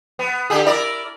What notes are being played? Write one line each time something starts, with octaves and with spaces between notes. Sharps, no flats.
B3
D3 G4 G#4
E4 A#4 D5